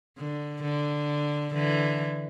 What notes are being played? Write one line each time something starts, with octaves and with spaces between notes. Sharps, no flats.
D3
D3
D3 E3